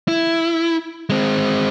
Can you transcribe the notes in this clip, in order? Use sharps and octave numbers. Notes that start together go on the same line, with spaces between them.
E4
G#3 C4